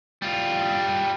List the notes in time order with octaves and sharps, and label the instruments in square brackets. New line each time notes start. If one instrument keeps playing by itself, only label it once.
[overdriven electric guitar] G3 F4